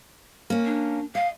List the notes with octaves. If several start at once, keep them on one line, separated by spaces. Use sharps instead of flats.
A#3 C#4
D4
D#5 F5